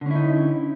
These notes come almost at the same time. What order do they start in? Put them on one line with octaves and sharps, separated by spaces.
D3 C#4 E4 D#4